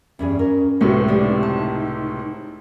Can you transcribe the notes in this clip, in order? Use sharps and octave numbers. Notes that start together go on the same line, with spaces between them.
E2 G2 C#4 G#4
A#4
C#2 A2 C3 F#4 A4 B4
C4 D4 D#4 G4
A5